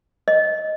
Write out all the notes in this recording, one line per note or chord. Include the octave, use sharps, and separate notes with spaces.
D#5